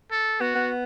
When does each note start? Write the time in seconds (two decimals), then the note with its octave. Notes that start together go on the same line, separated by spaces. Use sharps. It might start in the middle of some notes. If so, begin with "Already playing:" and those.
0.12 A4
0.40 B3 F#4
0.55 B3